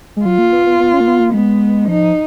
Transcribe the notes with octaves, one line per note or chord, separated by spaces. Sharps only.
G#3
F#3 F4
A#3
B3
B3
B3
C#4
A#3
B3
A#3
G#3 B3
F3 D#4